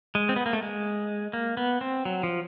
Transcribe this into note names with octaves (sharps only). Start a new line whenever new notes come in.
G#3
C4
B3
A#3
A3
G#3
A#3
B3
C4
F#3
F3